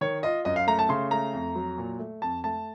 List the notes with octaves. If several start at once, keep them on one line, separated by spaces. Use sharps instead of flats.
D#3 C#5
F4 D#5
F#2 D#5
F5
A3 A#5
A5
C#3 C6
A3 A#5
F2
F#3
A#2
A3
F2 A5
A3 A5